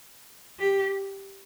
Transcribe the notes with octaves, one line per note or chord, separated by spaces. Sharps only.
G4